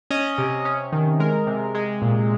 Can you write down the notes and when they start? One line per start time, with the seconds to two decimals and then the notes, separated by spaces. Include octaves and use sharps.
0.10 C#4 D#5
0.38 C3
0.65 C#4
0.92 D#3
1.20 G#3 A#4
1.47 C3
1.75 G#3
2.02 A#2